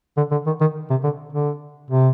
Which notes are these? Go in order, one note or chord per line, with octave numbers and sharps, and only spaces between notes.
D3
D3
D#3
D#3
C3
D3
D3
C3